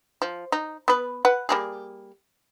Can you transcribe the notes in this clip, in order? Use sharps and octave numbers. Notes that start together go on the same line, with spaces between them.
F3
D#4
B3 B4
B4 F#5
G3 A#3 G#4